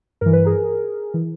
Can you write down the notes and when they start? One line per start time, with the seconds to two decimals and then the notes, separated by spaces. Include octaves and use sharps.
0.21 G2 E3 A#4
0.33 B4
0.45 G#4 A#4
1.14 E3